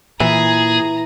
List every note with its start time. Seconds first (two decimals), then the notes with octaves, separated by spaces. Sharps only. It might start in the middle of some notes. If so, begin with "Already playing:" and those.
0.20 A#2 E3 G#4 A#5